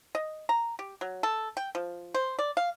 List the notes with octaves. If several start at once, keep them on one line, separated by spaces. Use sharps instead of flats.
D#5
A#5
G4
F#3
A4
G5
F3
C5
D5
F5